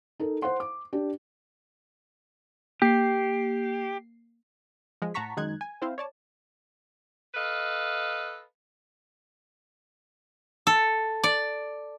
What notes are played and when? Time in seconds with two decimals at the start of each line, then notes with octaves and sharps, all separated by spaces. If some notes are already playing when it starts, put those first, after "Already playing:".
0.20 D#4 A4 A#4
0.42 C5 F#5 C6
0.60 D6
0.93 D4 G4
2.82 A#3 G4 C7
5.02 F3 G#3
5.14 A2 F#5 A5 A#5 C#6 B6
5.37 F#2 D#3 G#3 D#4 F#6 G#6
5.61 G#5
5.82 C4 E4 C5 F5
5.98 C#5 D5 A5
7.34 A4 B4 D#5 F5
10.67 A4
11.24 D5